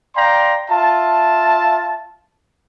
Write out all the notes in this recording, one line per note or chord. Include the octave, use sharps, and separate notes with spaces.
D5 F5 G5 A#5 C6
F4 E5 A5